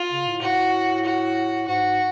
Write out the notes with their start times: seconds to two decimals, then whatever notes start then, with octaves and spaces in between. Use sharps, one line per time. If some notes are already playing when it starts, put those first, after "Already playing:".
Already playing: F4
0.10 C#3
0.26 A2
0.41 A2 F#4
1.06 F#4
1.68 G#2 F#4